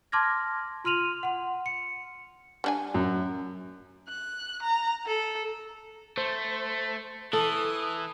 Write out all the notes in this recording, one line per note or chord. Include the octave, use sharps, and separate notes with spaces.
A5 C6 D6 F6 G#6 A#6
F4 C6 F6 D#7 F7 F#7
F#5 C6
C#7
G3 D4 G#5
F#2
F#6
A#5
A4
A3 C5
E3 A4 D#6